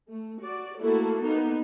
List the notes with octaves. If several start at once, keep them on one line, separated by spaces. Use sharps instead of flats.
A3
F#4 D5
A3 A#3 E4 F#4 A4
A#3 B3 D#4